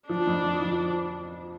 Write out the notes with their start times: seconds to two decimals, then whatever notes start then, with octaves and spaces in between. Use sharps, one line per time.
0.08 F3 D4
0.27 F2
0.44 F3
0.61 F3